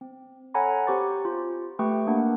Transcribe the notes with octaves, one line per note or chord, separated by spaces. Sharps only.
C4
A4 C#5 F#5 G#5 A#5 B5
C4 G4 C5 C#6 D6 A6
F4
A3 G4 B4 G5 C#6
A#3 D4 A#4 F#5